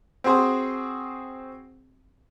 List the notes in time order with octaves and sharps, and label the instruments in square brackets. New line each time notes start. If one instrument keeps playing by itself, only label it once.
[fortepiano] C4 F#4 G#4 C5